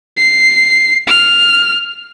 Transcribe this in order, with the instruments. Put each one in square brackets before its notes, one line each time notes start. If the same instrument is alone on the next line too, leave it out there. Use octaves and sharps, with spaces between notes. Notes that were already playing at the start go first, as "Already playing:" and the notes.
[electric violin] C7
F6